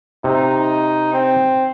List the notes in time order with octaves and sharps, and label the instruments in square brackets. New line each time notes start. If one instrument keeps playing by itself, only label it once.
[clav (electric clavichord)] C3 [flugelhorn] D#4
[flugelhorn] C4